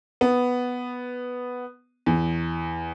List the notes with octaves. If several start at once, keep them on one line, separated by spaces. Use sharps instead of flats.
B3
E2